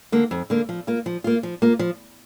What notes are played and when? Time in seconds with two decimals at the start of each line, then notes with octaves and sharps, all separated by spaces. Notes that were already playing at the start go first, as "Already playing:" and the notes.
0.12 D3 A#3
0.31 F2
0.50 D3 A#3
0.69 F3
0.87 A#3 F4
1.06 F3
1.24 A#3 F4
1.43 F3
1.62 A#3 F4
1.79 F3